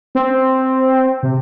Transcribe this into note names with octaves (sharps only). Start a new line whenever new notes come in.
C4
C3